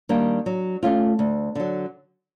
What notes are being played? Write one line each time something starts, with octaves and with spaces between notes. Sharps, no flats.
D#3 G3 A#3 D4
F#3
A3 C#4 F4
D2
D3 F#3